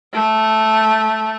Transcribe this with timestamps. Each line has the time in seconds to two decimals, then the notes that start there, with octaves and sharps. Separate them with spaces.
0.13 A3